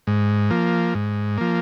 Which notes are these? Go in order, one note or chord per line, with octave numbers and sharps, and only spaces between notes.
G#2
F3 A#3
G#2
F3 A#3